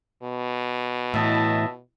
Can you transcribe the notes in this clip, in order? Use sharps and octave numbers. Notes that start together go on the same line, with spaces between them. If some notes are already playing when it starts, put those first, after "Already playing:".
B2
A2 E3 D#5 E5 A5